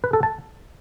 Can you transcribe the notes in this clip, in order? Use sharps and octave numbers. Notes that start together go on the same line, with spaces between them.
B4
A4
A5